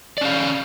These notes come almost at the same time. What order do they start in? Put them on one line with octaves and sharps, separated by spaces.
D5 C#4 F5